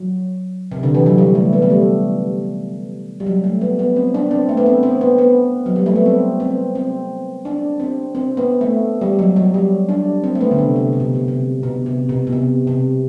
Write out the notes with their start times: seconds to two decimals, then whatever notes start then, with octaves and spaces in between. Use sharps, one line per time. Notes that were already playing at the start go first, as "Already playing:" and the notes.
Already playing: F#3
0.72 C3
0.83 D3
0.95 E3
1.06 F#3
1.18 G3
1.35 A3
1.53 B3
1.62 A3
1.70 G3
3.20 G3
3.26 F#3
3.44 A3
3.61 B3
3.79 B3
3.96 C4
4.14 D4
4.31 C4
4.49 A3
4.57 B3
4.66 C4
4.83 C4
5.01 B3
5.18 B3
5.66 F#3
5.76 G3
5.86 A3
5.96 B3
6.06 C4
6.40 C4
6.75 C4
7.45 D4
7.80 C4
8.15 C4
8.37 B3
8.61 A3
9.01 G3
9.19 F#3
9.36 F#3
9.54 G3
9.89 D4
10.24 C4
10.35 A3
10.41 B3
10.51 D3
10.58 C3
10.76 C3
10.93 C3
11.00 B2
11.15 B2
11.28 C3
11.63 B2
11.86 C3
12.09 B2
12.27 B2
12.33 C3
12.67 C3